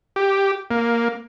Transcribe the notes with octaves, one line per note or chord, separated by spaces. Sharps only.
G4
A#3